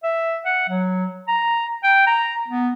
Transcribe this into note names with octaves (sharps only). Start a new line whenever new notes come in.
E5
F#5
F#3
A#5
G5
A#5
B3